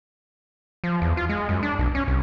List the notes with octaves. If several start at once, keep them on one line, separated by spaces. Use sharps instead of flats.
F3
E2
F4
G#3
F#2
D4
B1
C#4
C2